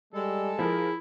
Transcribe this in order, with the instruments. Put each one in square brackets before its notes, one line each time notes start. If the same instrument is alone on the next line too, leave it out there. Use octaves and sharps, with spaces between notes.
[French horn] G3 [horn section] G#3 A4
[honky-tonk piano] F3 A#4 [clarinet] E4 [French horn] G#4